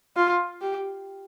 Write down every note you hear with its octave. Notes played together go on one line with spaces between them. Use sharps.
F4
G4